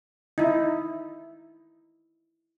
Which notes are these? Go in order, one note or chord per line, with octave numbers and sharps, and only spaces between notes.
D#4 E4